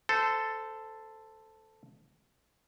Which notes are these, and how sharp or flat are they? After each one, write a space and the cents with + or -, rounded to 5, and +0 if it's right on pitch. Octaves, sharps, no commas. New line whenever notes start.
A4 +0 C5 -20